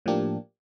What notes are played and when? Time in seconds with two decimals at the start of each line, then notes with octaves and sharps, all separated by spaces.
0.06 A2 F3 A#3 D4 G4